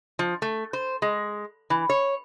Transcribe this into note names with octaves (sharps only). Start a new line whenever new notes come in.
F3
A3
C5
G#3
E3
C#5